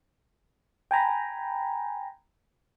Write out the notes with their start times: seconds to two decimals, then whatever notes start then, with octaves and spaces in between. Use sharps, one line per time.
0.91 G5 G#5 A#5 B5